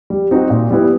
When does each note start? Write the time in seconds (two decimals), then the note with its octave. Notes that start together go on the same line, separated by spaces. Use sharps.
0.10 G3
0.31 C4 D#4 F#4
0.50 A#2
0.71 G3 B3 E4